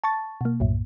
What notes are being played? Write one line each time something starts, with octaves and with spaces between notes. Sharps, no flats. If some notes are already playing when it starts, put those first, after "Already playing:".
A5 C#6 A6
B2 A#3
B1 F#2 A2